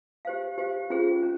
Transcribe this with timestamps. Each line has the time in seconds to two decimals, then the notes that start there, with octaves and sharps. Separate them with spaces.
0.25 G4 C5 F5
0.58 G4 C5 F5
0.90 C#4 F4 G#4 C5
1.23 C#4